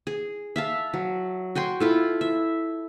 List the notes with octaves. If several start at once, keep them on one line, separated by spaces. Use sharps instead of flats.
G#4
E5 F5 A5
F#3
F#4 G5 G#5 C6
E4 F4 A4
E5